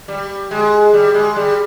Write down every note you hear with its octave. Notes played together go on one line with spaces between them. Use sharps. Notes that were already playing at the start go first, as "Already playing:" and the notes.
G3
G#3
G3
G#3
G3